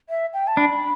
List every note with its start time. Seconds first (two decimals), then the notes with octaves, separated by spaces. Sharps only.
0.09 E5
0.33 G5
0.47 A5
0.57 D4 B5